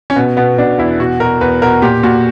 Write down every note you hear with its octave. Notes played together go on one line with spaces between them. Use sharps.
C#4
B2 B3
B2 B3
B2 D4
E2 E4
B2 F#4
B2 A#4
E2 B4
B2 A#4
A#2 G4
A#2 F#4